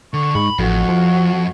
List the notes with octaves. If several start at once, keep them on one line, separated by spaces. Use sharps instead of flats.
D3 C#6
G#2 B5
A1 F2 F#4
F3